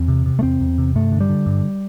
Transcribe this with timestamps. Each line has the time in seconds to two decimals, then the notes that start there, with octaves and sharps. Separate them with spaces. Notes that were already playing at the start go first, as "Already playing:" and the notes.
Already playing: E2 C4
0.08 C3
0.26 C3
0.39 A3
0.43 E2 C4
0.61 E2
0.78 C3
0.96 G2 A3
1.12 D3
1.20 G3
1.29 D3
1.46 G2